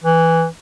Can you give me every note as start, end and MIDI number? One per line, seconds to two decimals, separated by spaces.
0.04 0.46 52